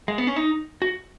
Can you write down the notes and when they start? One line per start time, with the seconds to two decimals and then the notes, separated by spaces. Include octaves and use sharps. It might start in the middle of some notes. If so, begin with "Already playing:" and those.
0.08 G#3
0.18 B3
0.27 C#4
0.36 D#4
0.82 F#4